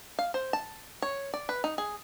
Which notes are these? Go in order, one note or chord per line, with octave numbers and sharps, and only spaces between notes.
F5
C5
A5
C#5
D5
B4
D#4
G#4